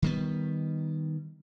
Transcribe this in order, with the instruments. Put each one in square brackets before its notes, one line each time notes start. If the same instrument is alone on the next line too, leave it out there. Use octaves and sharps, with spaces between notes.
[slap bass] D#3 G3 B3